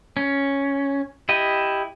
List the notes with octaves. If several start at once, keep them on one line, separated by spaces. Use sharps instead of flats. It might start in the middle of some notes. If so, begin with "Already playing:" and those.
C#4
E4 G4 D#5